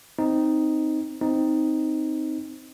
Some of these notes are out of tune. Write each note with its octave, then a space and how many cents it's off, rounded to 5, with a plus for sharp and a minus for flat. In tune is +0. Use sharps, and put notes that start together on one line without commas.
C4 +0 D#4 +0
C4 +0 D#4 +0